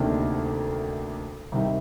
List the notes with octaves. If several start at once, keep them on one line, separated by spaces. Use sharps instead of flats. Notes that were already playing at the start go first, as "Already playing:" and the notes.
Already playing: D2 C3 D#3 A#3 D4
C2 C3 D#3